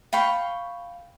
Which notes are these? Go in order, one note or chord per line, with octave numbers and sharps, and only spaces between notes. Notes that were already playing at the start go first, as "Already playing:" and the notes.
F5 G5 B5 C#6